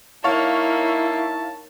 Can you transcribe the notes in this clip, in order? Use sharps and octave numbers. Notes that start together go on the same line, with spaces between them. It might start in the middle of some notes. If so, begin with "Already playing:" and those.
A#3 D#4 E4 C#5 F5 A5